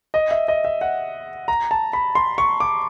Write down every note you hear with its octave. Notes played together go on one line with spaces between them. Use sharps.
D#5
E5
D#5
E5
F#5
A#5
A5
B5
C6
C#6
D6